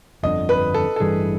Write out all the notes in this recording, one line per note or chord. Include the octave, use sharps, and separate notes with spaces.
G1 F2 D3 D#5
B4
A4
A4
A1 G2 E3 G3 G#4